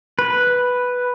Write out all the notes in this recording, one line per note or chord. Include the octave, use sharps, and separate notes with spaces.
B4